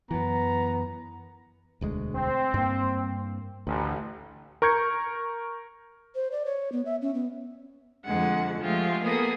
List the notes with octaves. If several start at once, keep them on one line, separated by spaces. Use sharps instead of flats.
F#2 E3 B3 A#5
E1 D2 G#3
C4
G2 A#3
A1 D2
A#4 C#6 G6 G#6 C#7
C5
D5
C#5
B3
E5
C#4
B3
F2 D3 G#3 F#5
F3 G#3 A3 F4 G4 G#4
A#3 B3 G#4 A4 D#6